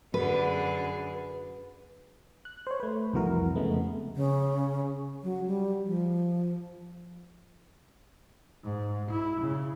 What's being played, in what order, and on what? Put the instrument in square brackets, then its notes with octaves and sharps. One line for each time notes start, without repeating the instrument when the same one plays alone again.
[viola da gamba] F#2 D3 G#4 [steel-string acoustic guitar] B4
[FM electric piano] F#6
C5 C#5
A3 B4
C2 F2 E3 F#4 A#4
F2 C#3 G#3 A3 B3
[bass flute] C#3
F#3
G3
F3
[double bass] G#2
E4
C#3